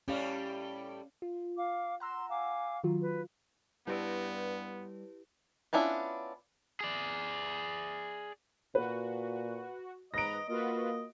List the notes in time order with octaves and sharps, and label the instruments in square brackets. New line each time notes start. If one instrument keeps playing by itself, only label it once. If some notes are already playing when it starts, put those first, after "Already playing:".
[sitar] A2 G3 G4 [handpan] C#4 F5
[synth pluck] F4
[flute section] F5 D6
[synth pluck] F#5 A#5 E6 [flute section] C6
[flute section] F5 G#5 D6
[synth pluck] D#3 F#3 F4
[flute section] B4
[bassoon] G2 [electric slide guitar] G3 C#5 D5 [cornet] B3 [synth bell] E4 G4 B4
[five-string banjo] B3 C#4 D4 E4 F4
[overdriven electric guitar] G#4 D5
[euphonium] A#2 [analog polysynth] F#4 [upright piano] B4
[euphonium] G#2 [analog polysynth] B4 A#5 [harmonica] D#5 [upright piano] A#6 D7
[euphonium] A#3 [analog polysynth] F4 F#4 B4 [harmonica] D#5